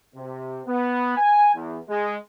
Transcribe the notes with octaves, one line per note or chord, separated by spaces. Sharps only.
C3
B3
G#5
E2
G#3